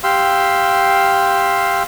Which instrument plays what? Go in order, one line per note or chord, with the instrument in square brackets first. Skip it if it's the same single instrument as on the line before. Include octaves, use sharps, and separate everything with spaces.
[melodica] G4 F5 C6 E6